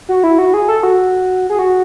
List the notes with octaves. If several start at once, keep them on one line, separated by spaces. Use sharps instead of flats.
F#4
E4
F#4
G#4
A4
F#4
G#4
F#4